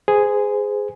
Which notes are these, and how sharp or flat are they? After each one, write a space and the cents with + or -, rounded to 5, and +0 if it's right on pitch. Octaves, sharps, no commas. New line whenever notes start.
G#4 +0 C5 -35